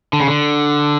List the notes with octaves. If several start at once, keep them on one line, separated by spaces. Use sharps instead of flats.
D3
C#3
D3